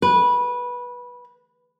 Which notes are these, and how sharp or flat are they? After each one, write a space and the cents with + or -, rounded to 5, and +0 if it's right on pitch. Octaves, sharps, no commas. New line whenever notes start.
B4 -15